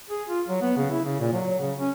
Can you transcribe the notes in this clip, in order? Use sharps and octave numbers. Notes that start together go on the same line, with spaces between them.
G#4
F4
F#3
B3
C#3
E4
C#3
A#2
F#3
C#3
C#4